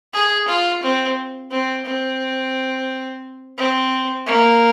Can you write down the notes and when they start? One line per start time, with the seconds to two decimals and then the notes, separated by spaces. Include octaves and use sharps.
0.13 G#4
0.48 F4
0.83 C4
1.51 C4
1.85 C4
3.58 C4
4.27 A#3